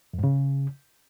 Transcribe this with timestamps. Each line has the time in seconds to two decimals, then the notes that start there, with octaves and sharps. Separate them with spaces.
0.14 F2
0.19 G#2
0.24 C#3